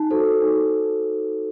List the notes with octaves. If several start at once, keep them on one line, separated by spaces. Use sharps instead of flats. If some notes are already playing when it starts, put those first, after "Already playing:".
Already playing: D#4 A5
F#4 A4 C5
D#4